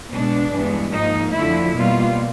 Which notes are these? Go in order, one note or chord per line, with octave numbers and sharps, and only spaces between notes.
B2 G#3 B3 D4
G2 E3 G#3 B3
G#2 F3 A#3 D#4
F2 D3 F3 A3 E4
B2 G3 A#3 F4